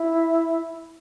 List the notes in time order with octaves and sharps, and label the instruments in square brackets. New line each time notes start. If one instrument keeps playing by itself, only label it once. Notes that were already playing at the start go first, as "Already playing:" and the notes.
Already playing: [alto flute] E4